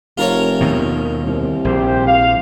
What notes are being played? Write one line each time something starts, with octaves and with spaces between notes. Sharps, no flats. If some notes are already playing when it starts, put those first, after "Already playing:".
F1 F4 A#4 C#5
D#2 B2 D#3
C2
A#1 G4 C5
F5